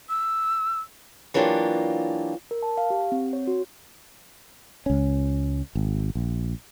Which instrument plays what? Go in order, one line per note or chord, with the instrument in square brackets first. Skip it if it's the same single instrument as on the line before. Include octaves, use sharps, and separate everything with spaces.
[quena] E6
[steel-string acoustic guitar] E3 F#3 A#3 D4 F4 G4
[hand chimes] A#4
A5
F5
G4
C4
C#5
F#4
[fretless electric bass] C#2 C#4
G#1
A#1